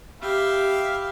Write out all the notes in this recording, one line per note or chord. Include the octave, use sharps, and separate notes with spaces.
G4 E5 F5 B5